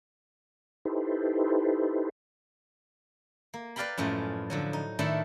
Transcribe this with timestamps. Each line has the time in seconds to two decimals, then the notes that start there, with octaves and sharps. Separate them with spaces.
0.85 D#4 E4 G4 A4 B4 C5
3.54 A#3
3.76 B4 D5 F5 G5 A#5 B5
3.98 F#2 A2 F3 G#3 F4
4.50 D3 F3 F#3
4.73 D#4
4.99 A2 D#3 D4 E4 A4 E5